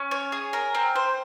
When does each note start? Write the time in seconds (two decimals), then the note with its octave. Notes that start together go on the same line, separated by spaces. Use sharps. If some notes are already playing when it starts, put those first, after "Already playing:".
Already playing: C#4
0.11 C#5
0.32 G#4
0.53 A#4
0.75 C4
0.96 C5